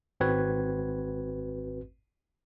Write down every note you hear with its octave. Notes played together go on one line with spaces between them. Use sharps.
G#1 C4 F#4 B4 G#6